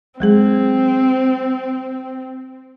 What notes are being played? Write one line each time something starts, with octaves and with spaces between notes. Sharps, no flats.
F#3 G#3 C4 G#4